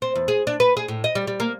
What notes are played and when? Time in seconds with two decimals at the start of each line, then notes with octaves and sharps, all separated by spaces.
0.02 C4
0.15 E2
0.28 G#4
0.47 D4
0.60 B4
0.77 G#4
0.88 A2
1.04 D#5
1.15 G3
1.27 G3
1.40 A#3